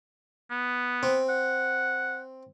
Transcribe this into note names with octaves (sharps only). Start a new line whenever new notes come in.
B3
C4
F#5